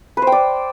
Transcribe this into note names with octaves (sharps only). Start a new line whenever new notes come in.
B4
C5
G5
D5